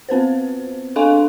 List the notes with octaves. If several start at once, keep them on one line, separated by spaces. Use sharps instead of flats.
B3 C4 B4 C5
D4 A4 F5 G#5 C6 C#6